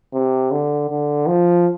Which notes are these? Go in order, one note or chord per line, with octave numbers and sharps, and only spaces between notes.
C3
D3
D3
F3